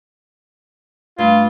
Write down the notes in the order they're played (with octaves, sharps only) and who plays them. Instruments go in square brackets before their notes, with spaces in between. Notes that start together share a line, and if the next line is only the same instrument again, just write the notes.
[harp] G2 A3 [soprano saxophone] F4